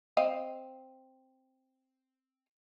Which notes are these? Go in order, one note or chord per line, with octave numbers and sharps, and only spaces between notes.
C4 D#5 F5